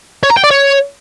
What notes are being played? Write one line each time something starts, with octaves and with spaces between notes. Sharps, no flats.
C#5
A#5
G5
D5
C#5